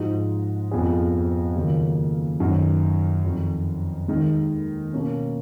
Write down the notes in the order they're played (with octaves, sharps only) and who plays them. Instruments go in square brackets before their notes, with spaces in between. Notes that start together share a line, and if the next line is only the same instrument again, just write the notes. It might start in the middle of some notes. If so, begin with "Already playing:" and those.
Already playing: [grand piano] G#2 F3 G#3 D#4 F#4
F2 F3 B3 F4 G#4
D#2 C#3 F#3 A#3 F4
F#2 D#3 F#3
F2 D#3 F#3
D#2 D#3 G#3
B2 A#3 C#4